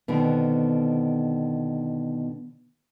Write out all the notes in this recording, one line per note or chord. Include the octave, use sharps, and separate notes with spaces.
B2 D3 D#3 B3 C4